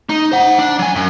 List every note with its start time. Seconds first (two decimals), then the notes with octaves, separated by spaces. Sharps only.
0.10 D#4
0.32 C5 F#5
0.59 D4
0.79 F#3 G#5
0.96 F#2